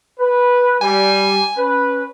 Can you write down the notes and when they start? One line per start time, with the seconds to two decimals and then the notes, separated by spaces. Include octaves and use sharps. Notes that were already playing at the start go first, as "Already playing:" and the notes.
0.20 B4
0.82 G3 G#5
1.56 C#4 B4